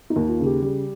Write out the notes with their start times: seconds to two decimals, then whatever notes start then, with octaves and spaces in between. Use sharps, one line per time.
0.10 D#4
0.16 D#2
0.28 F4
0.40 C#3
0.46 G4
0.62 G3